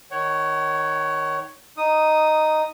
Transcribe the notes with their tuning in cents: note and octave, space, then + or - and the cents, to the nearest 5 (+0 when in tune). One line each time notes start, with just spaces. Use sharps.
D#3 +0 C#5 +0 F#5 +35
D#4 -5 D#6 +0